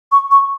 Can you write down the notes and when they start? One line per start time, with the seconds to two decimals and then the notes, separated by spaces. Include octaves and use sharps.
0.12 C#6
0.31 C#6